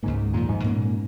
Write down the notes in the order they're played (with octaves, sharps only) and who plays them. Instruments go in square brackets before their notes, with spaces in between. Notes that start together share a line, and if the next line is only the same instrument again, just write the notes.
[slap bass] C#2 C#3 A#3 [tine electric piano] G#2
[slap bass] F2 D#3 G#3 [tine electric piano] A#2
[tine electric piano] G#2
[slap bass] A#2 A#3 C#4